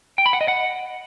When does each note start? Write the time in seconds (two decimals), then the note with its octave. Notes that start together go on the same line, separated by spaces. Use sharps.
0.18 G5
0.26 B5
0.33 F#5
0.41 D#5
0.48 F#5